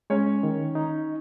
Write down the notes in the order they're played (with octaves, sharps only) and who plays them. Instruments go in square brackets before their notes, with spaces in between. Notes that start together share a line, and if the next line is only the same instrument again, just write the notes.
[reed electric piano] G#3 [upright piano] C#4 C#5
[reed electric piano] D#3
D#4